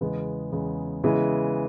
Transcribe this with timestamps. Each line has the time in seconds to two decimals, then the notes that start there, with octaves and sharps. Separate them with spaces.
0.01 E2 C#3 G#3 B3
0.52 E2 C#3 G#3 B3
1.04 C#3 E3 G#3 B3